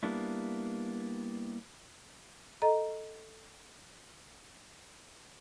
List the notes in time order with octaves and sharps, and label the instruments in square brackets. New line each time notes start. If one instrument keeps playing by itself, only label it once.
[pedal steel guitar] G3 A#3 B3 D4 E4
[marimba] A4 D#5 A#5